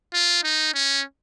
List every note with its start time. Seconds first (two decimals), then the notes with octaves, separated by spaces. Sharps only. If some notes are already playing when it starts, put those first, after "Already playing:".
0.14 F4
0.44 D#4
0.74 C#4